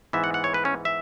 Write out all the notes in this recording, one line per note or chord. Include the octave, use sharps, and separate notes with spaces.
G#2 E3 B3 E5
F#5
F#5
C#5
B4
C#4
E5